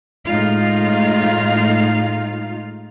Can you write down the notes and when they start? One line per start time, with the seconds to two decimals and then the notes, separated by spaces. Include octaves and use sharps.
0.26 A2 G#3 D#4 F4 F5